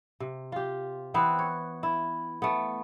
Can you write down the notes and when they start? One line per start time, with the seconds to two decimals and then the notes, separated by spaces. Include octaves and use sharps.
0.20 C3
0.52 F4 G4
1.14 E3 B3 C4 B4
1.39 C#5
1.83 E4
2.42 A3 B3